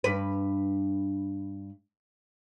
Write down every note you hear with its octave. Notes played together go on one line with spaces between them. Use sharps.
G2 B4